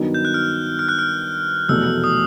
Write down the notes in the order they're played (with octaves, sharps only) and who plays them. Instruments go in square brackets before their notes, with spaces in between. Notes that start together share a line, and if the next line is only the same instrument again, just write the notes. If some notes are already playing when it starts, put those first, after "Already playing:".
Already playing: [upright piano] G2 D#3 F#3 B3
[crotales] G6
F#6
F6
F6
F#6
F6
[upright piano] F1 E2 B2 F#3 A3 [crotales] E6
[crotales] D#6